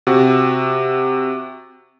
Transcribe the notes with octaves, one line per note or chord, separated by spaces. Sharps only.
C3 F#4